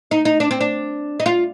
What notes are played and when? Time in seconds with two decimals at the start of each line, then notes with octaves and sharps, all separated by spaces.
0.11 D#4
0.25 D#4
0.40 D4
0.51 C4
0.61 D4
1.20 D#4
1.26 F4